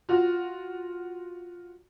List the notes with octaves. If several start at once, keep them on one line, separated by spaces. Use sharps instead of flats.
F4 F#4